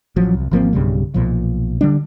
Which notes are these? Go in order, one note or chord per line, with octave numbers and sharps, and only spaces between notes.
A1 F3 F#3
C2
G#1 F3 A#3 C4
B1 G2 C#3 G3
B1 A#2 F3
D3 G3 D4